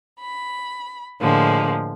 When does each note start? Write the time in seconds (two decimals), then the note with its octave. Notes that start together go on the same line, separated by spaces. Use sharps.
0.20 B5
1.19 A2 D3 F3 G#3 A#3